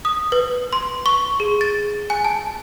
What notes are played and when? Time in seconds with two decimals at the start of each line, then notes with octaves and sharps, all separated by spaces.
0.05 D#6
0.32 B4
0.73 C6
1.06 C#6
1.40 G#4
1.61 A6
2.10 G#5
2.25 A5